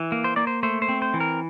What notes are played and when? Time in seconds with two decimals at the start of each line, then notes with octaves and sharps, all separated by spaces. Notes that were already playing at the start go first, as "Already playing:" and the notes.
Already playing: E3
0.12 A#3
0.24 C5
0.36 A#3 D5
0.47 C5
0.63 A3 C5
0.82 C5
0.89 C4
1.02 C5
1.14 E3
1.20 A#4